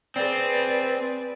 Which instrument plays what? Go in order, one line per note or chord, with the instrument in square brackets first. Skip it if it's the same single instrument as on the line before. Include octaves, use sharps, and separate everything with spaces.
[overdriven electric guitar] C4 [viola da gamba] G#4 B4 D5